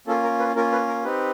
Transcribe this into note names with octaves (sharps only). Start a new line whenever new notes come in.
A#3 C#4 F4 A4
A#4
B4
A#3 C#4 F4 A#4
B4
A#4
C4 D#4 G4 B4